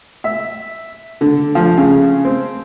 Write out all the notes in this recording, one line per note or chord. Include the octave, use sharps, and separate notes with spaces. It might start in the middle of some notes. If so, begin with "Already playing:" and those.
E5
D3
F3
C#3
C4